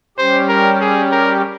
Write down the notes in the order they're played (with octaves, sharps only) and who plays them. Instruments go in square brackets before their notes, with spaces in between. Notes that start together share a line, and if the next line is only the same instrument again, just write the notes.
[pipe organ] G3 C#4 G4 [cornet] C5
[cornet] A#4
G#4
A#4